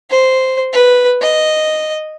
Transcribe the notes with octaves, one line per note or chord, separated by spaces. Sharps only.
C5
B4
D#5